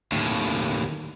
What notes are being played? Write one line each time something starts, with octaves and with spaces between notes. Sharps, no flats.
D#2 A2